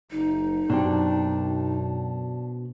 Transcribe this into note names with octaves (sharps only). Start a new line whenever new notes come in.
F#1 D#4
F#2 B2 C4 D4 G4